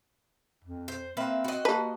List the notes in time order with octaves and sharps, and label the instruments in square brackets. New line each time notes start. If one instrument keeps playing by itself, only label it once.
[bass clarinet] F2
[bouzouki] C5
[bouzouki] A#3 B4 E5 [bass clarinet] C4
[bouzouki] F#4 D#5
[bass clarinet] A#3 [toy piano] G4 A5 A#5 [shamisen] B4